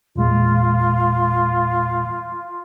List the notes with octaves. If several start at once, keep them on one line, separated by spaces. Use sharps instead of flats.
E2 A#2 G#3 F4